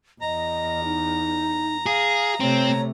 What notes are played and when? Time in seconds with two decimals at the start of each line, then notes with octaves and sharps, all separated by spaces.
0.21 E2 D#5 A#5
0.85 D#4
1.86 G#4 F5
2.40 C3 A3 C4 C#5